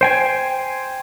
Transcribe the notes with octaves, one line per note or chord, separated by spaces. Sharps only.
C5 G5 G#5